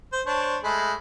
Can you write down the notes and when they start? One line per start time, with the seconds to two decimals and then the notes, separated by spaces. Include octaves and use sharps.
0.12 C5
0.26 D4 C5 C#5
0.64 G#3 A3 B5